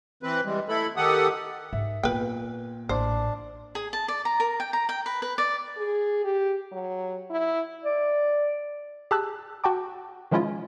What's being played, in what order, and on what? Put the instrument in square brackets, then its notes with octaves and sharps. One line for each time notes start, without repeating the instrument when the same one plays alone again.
[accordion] E3 C4 B4
E3 G3 G#3
A3 E4 A4 B5
D#3 G4 A4 F#5 D#6
[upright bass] G#2 [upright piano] E5
[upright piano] A#2 [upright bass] B3 [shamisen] B4 G5
[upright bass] A1 [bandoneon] D4 [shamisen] C5
[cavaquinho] G#4
A5
D5
A#5
A#4
G5
A#5
G5
B4
B4
D5
[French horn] G#4
G4
F#3
E4
[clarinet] D5
[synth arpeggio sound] G4 G#4 A5 E6 F#6
F#4 F#5 G5 A5 D6
D#3 F3 G#3 C#4 E4 F4